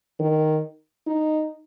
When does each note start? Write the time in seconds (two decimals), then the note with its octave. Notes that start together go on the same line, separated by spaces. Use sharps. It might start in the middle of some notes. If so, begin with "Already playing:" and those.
0.20 D#3
1.07 D#4